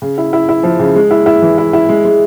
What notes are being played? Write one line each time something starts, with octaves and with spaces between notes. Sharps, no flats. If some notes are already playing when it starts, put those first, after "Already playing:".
C#3
E4
E4
E4
F3
C#3
G#3
E4
E4
E3
E4
E4
G#3
G#3